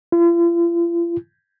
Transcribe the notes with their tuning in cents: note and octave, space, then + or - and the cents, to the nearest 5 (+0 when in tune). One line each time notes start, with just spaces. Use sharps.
F4 -45